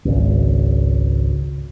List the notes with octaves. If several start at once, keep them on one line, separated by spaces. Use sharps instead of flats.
G#1 C#2